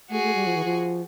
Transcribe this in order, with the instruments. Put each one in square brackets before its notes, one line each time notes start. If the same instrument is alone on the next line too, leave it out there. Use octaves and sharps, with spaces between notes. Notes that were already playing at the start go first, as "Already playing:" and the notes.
[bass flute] A3 [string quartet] F#4 G#4
[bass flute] A3
G3
F3
E3
F3